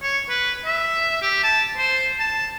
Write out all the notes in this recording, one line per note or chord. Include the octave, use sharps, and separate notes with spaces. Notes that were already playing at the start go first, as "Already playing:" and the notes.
C#5
B4
E5
G4
A5
C5
A5